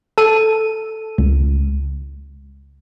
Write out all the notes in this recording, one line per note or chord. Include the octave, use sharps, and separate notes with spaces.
A4 D#7
C#2